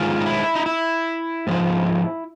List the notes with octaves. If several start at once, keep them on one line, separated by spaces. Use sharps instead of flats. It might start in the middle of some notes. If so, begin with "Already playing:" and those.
Already playing: G#2 D#3 G#3 F4
D#4
E4
D#4
E4
G#2 F3 G#3